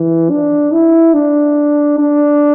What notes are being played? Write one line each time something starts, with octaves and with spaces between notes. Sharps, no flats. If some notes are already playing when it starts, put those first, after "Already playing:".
Already playing: E3
D4
E4
D4
D4